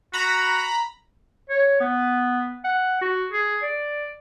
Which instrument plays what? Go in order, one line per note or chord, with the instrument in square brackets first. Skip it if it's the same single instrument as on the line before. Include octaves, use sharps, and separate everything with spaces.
[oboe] F#4 [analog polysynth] A#5 B5
[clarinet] C#5
B3
F#5
F#4
G#4
D5